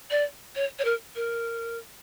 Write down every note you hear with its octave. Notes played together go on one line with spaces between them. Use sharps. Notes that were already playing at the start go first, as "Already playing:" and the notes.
D5
C#5
C#5
A#4
A#4